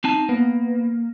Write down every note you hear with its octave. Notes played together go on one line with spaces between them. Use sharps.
C4 D#4 A5
A#3 B3